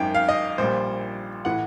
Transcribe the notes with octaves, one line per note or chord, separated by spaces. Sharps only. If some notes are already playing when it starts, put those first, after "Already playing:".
Already playing: G#1 F#2 D#3 G5
F5
D#5
A#1 A#2 G3 C5
A2 E3 F#5